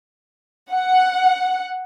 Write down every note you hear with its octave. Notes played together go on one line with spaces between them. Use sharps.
F#5